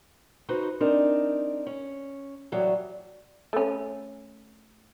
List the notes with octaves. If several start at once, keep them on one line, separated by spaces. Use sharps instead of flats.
D#4 F#4 B4 C5
C4 D4 D#4 A#4
C#4
A2 E3 F#3 G3
A3 C#4